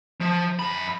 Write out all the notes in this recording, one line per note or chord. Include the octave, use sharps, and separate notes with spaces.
F3
F#2 B5